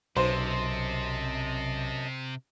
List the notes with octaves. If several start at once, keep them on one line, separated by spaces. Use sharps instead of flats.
B1 F#2 C3 C5 D#5 A5